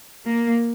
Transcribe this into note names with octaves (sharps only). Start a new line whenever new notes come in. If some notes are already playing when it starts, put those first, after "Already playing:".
A#3